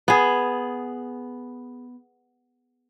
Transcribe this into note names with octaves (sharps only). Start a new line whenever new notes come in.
B3 G#4